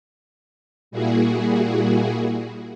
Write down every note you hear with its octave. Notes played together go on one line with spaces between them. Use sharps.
A#2 G3 A#3 E4 F#4 G#4